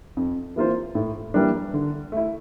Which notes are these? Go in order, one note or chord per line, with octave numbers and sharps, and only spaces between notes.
F2
E3 A#3 F4 C5
A2
E3 G3 A#3 D4
D3
A3 E4